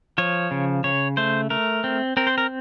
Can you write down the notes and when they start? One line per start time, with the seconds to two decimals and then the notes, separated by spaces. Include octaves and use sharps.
0.18 F3 C#5
0.51 C#3
0.84 C#3 C#5
1.17 A3 C5
1.50 A3 A#4
1.84 C4
2.17 C4 A#4
2.27 C5
2.38 A#4